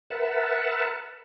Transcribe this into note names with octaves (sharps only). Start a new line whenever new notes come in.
A#4 B4 E5 F#5 A5